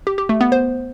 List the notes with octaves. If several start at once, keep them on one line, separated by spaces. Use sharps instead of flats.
G4
G4
A3
B3
C5